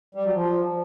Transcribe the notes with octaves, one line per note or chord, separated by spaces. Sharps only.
G3
F#3
F3